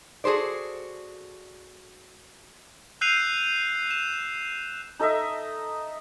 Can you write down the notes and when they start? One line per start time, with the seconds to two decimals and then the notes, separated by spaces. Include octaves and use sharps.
0.24 F#4 G#4 A4 C5 D5
3.01 E6 F#6 G6 C7 D#7 F7
3.91 E7
4.99 D#4 A4 D#5 E5